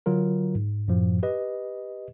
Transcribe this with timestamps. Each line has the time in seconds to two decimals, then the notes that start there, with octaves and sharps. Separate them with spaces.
0.06 D3 F#3 F4 A#4
0.55 G#2
0.88 F#2 A2 F3
1.23 G4 B4 D#5